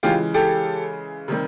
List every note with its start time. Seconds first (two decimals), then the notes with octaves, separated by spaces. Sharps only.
0.03 C#3 E3 G#3 F4 G4
0.34 G4 A4
1.28 C3 D#3 G3